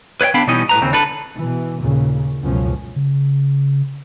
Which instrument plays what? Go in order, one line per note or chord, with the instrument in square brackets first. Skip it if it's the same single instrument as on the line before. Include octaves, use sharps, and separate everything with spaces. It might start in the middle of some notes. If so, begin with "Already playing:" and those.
[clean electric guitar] B4 C#5 E5 G5
D3 B3 D4 F5 G5 B5
B2 E3 G3 C#4 D#4 D#5
A2 B4 A#5
D#2 C#3 C4
D4 A4 B4
[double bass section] B2 E3
D#2 A#2 C#3
C#2 F#2 B2 F3 C#4
[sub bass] C#3